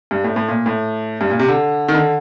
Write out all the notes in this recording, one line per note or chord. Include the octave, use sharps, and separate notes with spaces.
G2
A2
A2
A#2
A2
G2
A#2
C3
D3
D#3
D3